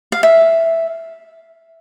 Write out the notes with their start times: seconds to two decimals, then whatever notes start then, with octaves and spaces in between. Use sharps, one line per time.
0.12 F5
0.23 E5